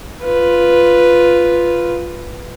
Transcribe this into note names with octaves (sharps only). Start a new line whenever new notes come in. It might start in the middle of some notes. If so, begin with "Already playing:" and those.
F4 B4